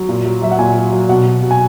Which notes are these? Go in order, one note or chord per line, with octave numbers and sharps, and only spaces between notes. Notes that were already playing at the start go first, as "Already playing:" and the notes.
Already playing: F#3
A#2
F#3
F#3 E5
F#5
A#2 G#5
F#3
F#3
B2 F#5
B2
F#3
G#5